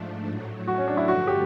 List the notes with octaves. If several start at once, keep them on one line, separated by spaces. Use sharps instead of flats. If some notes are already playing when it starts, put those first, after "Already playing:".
Already playing: G#2 F3 A3 D4
A2 F#3 A3
F#4
C#4
D4
E4
G2 D3 F3 A3 F#4
G4